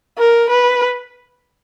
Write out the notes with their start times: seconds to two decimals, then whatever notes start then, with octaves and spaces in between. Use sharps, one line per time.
0.18 A#4
0.50 B4